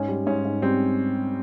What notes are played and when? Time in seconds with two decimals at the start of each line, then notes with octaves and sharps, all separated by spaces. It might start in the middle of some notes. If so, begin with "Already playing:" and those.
Already playing: G#2 C#4
0.08 G3
0.27 G#2 C#4
0.45 G#2
0.62 G3 C4